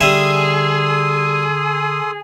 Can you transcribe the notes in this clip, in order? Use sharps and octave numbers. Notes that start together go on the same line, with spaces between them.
D3 G3 G#4 A4 E5 C6 D#6